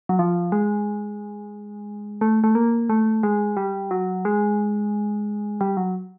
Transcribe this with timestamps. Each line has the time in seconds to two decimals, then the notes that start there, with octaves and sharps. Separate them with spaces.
0.09 F#3
0.19 F3
0.52 G#3
2.21 A3
2.44 A3
2.55 A#3
2.90 A3
3.23 G#3
3.57 G3
3.91 F#3
4.25 G#3
5.61 G3
5.77 F#3